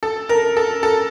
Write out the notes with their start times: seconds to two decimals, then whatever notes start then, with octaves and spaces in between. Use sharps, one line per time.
0.03 A4
0.29 A#4
0.57 A4
0.83 A4